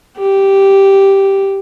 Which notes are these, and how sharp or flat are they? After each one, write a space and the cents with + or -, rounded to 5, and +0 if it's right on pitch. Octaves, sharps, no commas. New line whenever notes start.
G4 -5